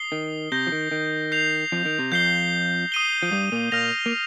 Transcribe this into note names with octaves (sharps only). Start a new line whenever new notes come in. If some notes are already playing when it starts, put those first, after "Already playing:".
Already playing: D#6 C7 G7
D#3
C3 G6 A#6 G7
F3
D#3
D#3
G6 C7 F7
F2 F3
D#3
C3
F2 F3 G6 C7 G7
D#6 C7 D#7 G7
F3
G2 G3
A#2 A#3
A#2 A#3 F6 A#6 F7
A#3